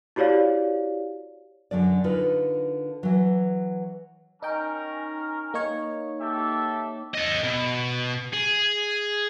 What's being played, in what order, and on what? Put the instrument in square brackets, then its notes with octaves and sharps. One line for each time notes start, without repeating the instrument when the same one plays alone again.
[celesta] E4 F#4 G4 C#5 D5 F5
[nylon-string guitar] F#2 D3 F#3 D5
D3 D#4 F4 A#4 B4
E3 F#3
[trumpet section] C#4 A#4 [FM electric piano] D#4 G5
[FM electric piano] A#3 D#4 C#5
[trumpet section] G4 A4 E5
[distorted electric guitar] A4 D#5
B2
G#4